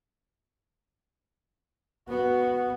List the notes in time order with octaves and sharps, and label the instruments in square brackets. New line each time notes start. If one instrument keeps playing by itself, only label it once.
[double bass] B3 [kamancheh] F#4